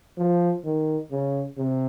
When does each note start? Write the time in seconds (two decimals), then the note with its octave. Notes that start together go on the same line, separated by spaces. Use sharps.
0.17 F3
0.64 D#3
1.11 C#3
1.58 C3